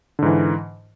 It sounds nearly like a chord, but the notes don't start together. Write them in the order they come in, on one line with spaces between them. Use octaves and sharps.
D3 G#2 E3